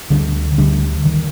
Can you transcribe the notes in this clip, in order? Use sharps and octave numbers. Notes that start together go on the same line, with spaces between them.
D2 D3 G3 D4
D2 D3 G3 D4
D#3